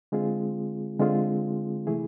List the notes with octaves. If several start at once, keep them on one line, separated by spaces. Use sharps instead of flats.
D3 G#3 C4 F4 G#4
D3 G#3 C4 F4 G#4
C3 E3 A3 E4 G#4